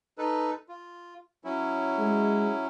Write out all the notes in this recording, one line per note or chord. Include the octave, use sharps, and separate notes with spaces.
D#4 A4 B4
F4
F#3 C#4 E4
G#3